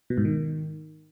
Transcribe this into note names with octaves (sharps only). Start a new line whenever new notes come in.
B2
G#2
D#3